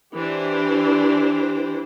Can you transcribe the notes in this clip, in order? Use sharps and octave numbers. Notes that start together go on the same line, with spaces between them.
E3 D4 G4 C5